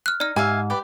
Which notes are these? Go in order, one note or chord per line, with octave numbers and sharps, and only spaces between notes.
F6 F#6
D#4 D5 F6
G#2 G4 E5 F5 G#5
G4 B4 D5